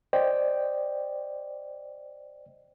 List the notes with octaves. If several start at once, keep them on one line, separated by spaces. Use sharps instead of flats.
C5 D5 D#5 G5